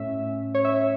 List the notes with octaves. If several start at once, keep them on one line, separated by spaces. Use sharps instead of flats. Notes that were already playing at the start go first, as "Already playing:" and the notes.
Already playing: A2 A3 C#4 E5
C#5
E5